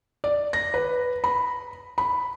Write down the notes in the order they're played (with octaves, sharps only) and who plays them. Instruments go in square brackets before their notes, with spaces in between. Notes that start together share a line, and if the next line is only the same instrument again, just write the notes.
[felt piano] D5
A#6
B4
B5
B5